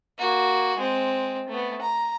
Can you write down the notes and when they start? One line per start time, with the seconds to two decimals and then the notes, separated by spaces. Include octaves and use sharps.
0.18 A#3 F#4
0.77 G#3 C4
1.48 A3 B3
1.81 A#5